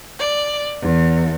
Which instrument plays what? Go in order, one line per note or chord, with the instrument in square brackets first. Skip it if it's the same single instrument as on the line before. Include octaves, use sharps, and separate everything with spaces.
[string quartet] D5
E2